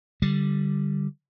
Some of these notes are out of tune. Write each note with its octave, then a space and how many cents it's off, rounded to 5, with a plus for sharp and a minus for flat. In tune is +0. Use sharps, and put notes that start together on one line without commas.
D3 +0 G3 -5